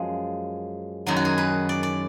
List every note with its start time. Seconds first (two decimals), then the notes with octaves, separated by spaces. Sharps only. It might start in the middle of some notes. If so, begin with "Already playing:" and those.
Already playing: F#2 F3 G#3
1.07 F#2 D#3 F#3 G#4
1.16 F#4
1.25 G#4
1.38 B4
1.69 D5
1.83 D5